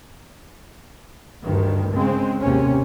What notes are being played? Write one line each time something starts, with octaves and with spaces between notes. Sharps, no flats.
D2 G2 D#3
C#3 G#3 C4
G#1 D#2 C3 A#3 C4 C#4